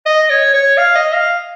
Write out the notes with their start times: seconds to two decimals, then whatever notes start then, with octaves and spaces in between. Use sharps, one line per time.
0.06 D#5
0.30 C#5
0.54 C#5
0.77 F5
0.95 D#5
1.13 F5